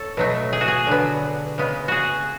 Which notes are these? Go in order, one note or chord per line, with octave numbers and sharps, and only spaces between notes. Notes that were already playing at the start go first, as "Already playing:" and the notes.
Already playing: A4 C#5
B2 F#3 A3
G#4
F#4
G#4
D3 F#3 B3
C#3 G#3 B3
F#4 G#4